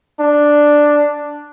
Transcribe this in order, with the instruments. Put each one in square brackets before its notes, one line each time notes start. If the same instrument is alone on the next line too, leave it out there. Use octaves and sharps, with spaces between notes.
[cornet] D4